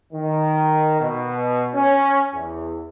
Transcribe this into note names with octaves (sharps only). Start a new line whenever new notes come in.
D#3
B2
C#4
E2